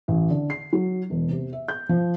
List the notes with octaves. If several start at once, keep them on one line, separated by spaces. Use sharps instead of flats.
A1
D3
C7
F#3
E1
C3
E5
G6
F3